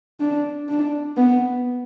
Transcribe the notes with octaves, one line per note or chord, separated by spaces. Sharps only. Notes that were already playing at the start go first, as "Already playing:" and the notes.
D4
D4
B3